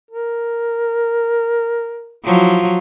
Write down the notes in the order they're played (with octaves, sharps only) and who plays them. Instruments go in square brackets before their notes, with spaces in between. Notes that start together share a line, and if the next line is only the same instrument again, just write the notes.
[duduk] A#4
[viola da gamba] F3 F#3 F4 [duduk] E4